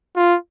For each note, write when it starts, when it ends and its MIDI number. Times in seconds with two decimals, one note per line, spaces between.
0.16 0.36 65